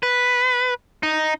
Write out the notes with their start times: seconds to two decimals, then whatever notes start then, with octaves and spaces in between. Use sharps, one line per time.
0.03 B4
1.03 D#4